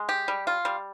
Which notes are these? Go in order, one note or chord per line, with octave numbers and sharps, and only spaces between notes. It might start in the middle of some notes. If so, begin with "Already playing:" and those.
Already playing: G#3
G4
G3
F4
G3